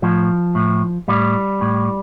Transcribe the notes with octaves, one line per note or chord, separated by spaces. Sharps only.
A2 F3
A2
A2 G3
A2